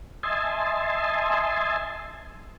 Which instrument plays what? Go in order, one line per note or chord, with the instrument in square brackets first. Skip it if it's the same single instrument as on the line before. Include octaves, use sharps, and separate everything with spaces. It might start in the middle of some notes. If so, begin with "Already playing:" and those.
[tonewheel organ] D#5 E5 G#5 A5 C6